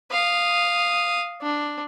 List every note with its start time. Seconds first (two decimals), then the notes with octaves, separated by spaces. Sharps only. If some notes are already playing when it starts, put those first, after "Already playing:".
0.11 F5 D#6
1.42 D4